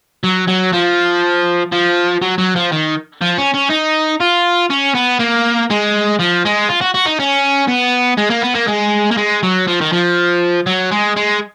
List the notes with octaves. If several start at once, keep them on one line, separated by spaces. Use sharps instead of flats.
F#3
F#3
F3
F3
F#3
F#3
F3
D#3
F3
C#4
C#4
D#4
F4
C#4
B3
A#3
G#3
F3
G#3
F4
F#4
F#4
D#4
C#4
B3
G#3
A#3
B3
A#3
G#3
A#3
G#3
F#3
F3
D#3
F3
F#3
G#3
G#3